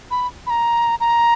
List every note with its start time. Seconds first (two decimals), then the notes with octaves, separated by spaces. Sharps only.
0.11 B5
0.47 B5
0.50 A#5
1.00 A#5